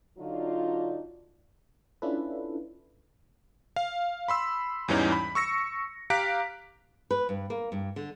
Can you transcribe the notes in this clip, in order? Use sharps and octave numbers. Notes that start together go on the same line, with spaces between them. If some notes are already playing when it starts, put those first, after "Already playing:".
D3 F#3 D4 D#4 F4
C#4 D4 E4 F4 A4 B4
F5
B5 C6 E6
E2 G#2 E3 G3 C#4 D#4
B5
C#6 E6 A#6 C#7
G4 F5 A#5 F#6 B6 D7
B4
G2
A#3
G2
D3